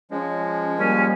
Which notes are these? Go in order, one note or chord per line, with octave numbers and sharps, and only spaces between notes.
F3 G#3 C#4
G3 A#3 C#4 G#5